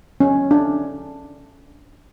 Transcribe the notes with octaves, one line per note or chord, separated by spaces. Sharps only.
C#4
D4